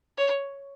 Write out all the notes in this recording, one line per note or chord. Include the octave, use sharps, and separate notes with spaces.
C#5